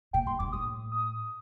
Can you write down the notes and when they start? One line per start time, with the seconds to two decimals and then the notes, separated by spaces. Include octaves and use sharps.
0.13 A#2 G5
0.27 G2 C6
0.39 G2 D6
0.52 A2 D#6
0.92 D#6